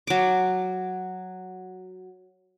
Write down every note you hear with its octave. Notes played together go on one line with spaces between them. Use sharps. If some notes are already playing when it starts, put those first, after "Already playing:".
F#3 D6